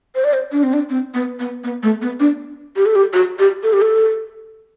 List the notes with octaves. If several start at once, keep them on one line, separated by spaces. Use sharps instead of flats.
C5
D5
C5
D4
C4
D4
C4
B3
B3
B3
A3
B3
D4
G4
A4
G4
F#4
G4
A4
G4
A4